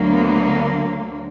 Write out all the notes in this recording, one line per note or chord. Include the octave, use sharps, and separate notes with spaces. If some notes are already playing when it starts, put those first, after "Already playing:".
Already playing: D2 D3 F#3 A#3
B3